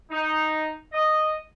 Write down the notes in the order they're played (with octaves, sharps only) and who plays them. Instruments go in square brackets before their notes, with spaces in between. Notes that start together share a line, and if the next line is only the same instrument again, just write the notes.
[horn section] D#4
D#5